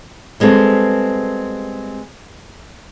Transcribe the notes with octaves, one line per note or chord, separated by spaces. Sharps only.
G3 G#3 B3 C4 A4